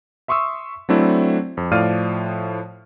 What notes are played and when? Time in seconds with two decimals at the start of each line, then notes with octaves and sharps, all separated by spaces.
0.28 E5 C6 C#6 D#6 E6
0.89 F#3 A3 C4 D4 E4
1.57 F2
1.71 A2 F3 D5 F5 F6 D#7